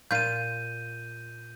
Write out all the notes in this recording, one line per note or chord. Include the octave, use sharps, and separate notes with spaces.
A#2 F4 G6 D#7